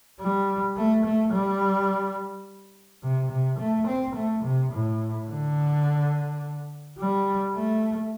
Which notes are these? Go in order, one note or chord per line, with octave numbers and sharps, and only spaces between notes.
G3
A3
A3
G3
C3
C3
A3
C4
A3
C3
A2
D3
G3
A3